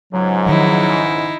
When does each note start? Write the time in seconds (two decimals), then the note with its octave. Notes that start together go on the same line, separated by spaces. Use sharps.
0.13 C#2 G#2 F#3
0.46 D#3 F3 D#4 E4